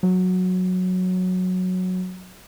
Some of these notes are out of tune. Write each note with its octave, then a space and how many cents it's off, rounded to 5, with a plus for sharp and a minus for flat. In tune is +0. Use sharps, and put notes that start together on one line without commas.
F#3 -10